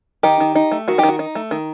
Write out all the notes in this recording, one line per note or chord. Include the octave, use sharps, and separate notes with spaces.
D#3 D#4 G4
D#3
D#4
A3
D#3 F#4
D#4 G4
D#3
F#4
D#4
A3
D#3